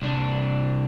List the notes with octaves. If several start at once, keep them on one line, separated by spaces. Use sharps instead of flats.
C2 D4